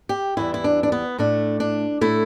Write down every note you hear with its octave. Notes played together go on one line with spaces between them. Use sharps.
G4
E2 E3 G3 E4
E4
D4
D4
B3
A2 A3 D4
D4
A2 A3 E4